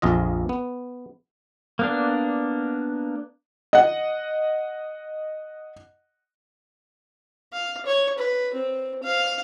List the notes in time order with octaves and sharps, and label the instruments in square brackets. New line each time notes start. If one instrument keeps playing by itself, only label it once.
[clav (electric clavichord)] A#1 F2 F4 D#5
B3
[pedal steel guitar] A#3 B3 D4
[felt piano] D#5 F#5
[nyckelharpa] F5
C#5
B4
C4
F5